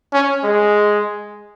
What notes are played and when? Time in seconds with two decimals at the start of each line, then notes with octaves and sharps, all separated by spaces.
0.13 C#4
0.44 G#3